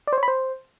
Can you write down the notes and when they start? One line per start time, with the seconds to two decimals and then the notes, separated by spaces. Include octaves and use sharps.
0.07 D5
0.13 C5
0.18 C#5
0.23 B5
0.28 C5